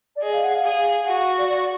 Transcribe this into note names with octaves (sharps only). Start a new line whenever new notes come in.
D5
G#4 D#5
F5
F#5
F5
G#4
F#4 F#5
F5
D5
D5